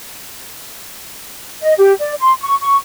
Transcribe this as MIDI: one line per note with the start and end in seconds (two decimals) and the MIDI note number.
1.63 1.74 75
1.78 1.93 67
1.99 2.14 74
2.20 2.33 84
2.41 2.55 85
2.61 2.76 85